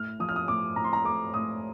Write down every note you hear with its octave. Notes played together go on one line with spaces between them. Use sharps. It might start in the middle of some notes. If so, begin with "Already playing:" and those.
Already playing: A2 F6
F3 D#6
F6
D#6
A2 D6
A2 A#5
C6
A#5
A3 D6
A2 D#6